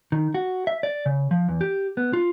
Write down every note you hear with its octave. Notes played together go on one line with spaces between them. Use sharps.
D#3
F#4
E5
D5
C#3
F3
E2
G4
B3
F4